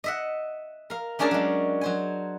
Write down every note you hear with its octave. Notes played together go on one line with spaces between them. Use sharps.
D#5 E5 F#5
A#4 F5
A3 C#4 D4 G#4 A#4 A5
F#3 G#3
F#3 C5 G#5